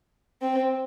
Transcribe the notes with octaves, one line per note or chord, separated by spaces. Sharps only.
C4